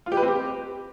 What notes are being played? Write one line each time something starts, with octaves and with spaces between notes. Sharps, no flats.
F4
G4
B4
C4
G4